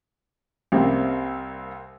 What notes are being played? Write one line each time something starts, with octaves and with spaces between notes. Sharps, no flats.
C2 C3 G3 A#3 C4